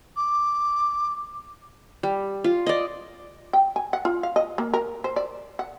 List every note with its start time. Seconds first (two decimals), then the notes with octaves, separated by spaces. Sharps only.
0.16 D6
2.03 G3
2.44 F4
2.66 D5 D#5
3.53 G5
3.76 G#5
3.93 F#5
4.05 F4
4.23 F5
4.36 D#5
4.58 A#3
4.74 A#4
5.04 C5
5.16 D5
5.59 F#5